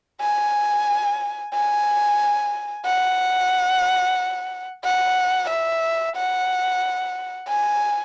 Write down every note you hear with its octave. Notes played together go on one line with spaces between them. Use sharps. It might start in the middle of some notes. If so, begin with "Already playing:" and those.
G#5
G#5
F#5
F#5
E5
F#5
G#5